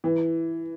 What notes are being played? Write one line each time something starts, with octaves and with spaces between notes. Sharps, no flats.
E3